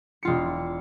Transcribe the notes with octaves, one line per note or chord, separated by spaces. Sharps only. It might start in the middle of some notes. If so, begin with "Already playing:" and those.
E1 F4 C#7